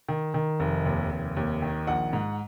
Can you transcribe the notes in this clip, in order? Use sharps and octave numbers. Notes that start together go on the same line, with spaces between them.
D#3
D#3
F1
D#2
F1
D#2
D#3
A#1 F#5
G#2